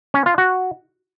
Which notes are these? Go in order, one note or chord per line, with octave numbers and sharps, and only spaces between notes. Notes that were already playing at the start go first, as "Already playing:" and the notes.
C#4
F4
F#4